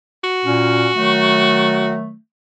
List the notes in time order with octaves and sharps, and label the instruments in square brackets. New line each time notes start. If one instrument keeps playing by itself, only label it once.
[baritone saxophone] F#4
[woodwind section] A#2 C#4
D#3 F#3 A3